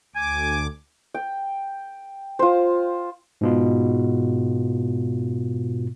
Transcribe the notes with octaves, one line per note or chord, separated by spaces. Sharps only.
D2 G#5 D6
G5
F4 C5
G#2 B2 F4